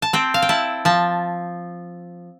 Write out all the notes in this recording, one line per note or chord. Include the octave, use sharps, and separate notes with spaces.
A5
C4 G5
F5
G5
E4 A5
F3 A5